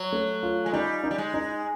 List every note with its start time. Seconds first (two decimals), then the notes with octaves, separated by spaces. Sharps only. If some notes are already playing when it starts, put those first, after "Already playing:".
Already playing: F#3
0.12 A3
0.43 F4
0.66 G#3
0.73 G3 D#4
1.04 D#4
1.11 G3
1.18 G#3
1.34 D#4